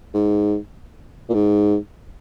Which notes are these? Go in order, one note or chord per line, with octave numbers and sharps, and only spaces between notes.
G#2
A#2
G#2